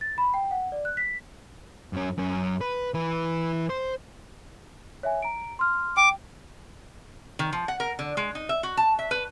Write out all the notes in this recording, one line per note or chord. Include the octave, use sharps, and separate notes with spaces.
A6
B5
G5
F#5
D5
F#6
B6
F#2 C#4
F#2 C#4
B4
E3 B4
C5
C#5 E5 G#5
A#5 D7
C6 F6
G5 D6
D#3
F3
F#5
A#4
D3
G#3
D#4
E5
F#4
A5
E5
B4